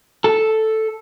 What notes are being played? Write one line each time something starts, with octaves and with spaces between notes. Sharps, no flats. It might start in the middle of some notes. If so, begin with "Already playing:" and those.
A4